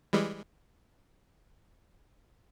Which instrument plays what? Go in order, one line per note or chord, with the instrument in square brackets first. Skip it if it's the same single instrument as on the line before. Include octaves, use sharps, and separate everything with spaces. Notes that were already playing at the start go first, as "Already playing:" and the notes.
[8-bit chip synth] E3 G3 G#3